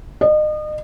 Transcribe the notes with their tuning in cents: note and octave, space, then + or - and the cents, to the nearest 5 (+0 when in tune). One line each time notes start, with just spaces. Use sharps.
D#5 -35